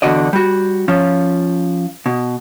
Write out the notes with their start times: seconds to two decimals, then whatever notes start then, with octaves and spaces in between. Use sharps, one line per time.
0.02 E2 B2 D3 F#4 D5 D#5
0.33 G3 F#4
0.88 F3 C#4 F4
2.06 B2